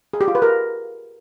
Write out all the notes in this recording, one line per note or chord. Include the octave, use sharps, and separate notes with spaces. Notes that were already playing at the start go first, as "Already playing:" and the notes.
G#4
G4
F4
B4
A#4